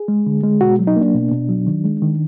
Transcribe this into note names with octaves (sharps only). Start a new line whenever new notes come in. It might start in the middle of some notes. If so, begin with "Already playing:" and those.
Already playing: G#4
G#3
D3
G#3
B2 F#4
F#3
D#4
A#3 D4
B2
B2
F#3
D#3
G#3
D#3